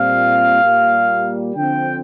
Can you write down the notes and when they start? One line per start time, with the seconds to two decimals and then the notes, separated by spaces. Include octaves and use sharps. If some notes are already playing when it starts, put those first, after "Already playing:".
Already playing: A#2 G3 C4 F5
0.62 A#2 G3 A#3
1.55 D3 F3 C4 G5